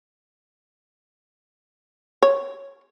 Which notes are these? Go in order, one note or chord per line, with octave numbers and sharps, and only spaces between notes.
C#5